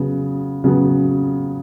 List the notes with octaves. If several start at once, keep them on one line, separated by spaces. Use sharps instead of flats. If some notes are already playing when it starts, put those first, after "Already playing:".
Already playing: C#3 F#3 B3
C#3 F#3 B3